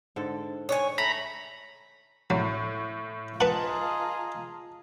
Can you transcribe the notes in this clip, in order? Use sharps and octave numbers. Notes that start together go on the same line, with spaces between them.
G#2 D3 A4
C#5 F#5 G#5
A3 A#5 B5
A2 F#3
F4 G#4 B4 D#5 F#5 A5 A#5